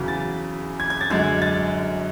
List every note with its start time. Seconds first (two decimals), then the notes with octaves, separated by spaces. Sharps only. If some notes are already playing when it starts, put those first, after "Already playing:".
Already playing: E2 C#3 F#3
0.08 A6
0.80 G#6
0.90 G#6
1.01 A6
1.11 F#2 D3 G#3 G#6
1.42 A6